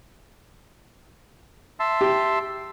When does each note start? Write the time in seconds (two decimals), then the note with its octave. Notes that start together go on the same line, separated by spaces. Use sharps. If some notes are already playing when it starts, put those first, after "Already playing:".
1.80 E5 A5 C6
2.01 G4